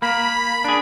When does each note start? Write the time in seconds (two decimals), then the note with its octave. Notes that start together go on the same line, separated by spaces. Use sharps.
0.02 A#3 B5
0.64 D4 G#4